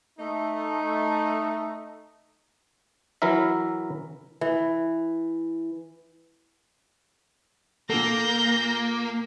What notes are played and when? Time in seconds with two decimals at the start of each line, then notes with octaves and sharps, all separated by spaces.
0.19 A3 D#4
3.22 E3 F#3 E4 A#4 E5
4.41 E3
7.90 A#2 A#3 A4 G6 A#6